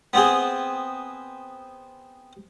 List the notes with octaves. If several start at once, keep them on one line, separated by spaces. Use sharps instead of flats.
B3 C4 G#4